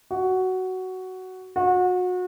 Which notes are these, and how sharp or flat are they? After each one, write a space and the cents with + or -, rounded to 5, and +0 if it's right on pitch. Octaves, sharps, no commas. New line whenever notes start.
F#4 +10
F#4 -30